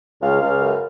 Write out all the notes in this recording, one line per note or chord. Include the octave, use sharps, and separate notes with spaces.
C#2 F5
C#2
F#2